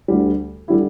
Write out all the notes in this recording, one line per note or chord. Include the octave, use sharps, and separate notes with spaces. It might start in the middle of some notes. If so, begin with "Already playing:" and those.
D2 D3 G3
D3 G3 E4